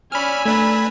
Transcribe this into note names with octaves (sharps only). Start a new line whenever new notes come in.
C#4 D5 G#5 B5 E6 F6
A3 D4 A#4 B4 B5 G#6